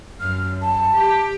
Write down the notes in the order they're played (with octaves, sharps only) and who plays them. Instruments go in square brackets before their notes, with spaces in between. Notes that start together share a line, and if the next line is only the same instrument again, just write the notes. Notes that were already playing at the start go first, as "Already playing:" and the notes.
[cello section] F#2 [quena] F6
[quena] A5
[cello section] G4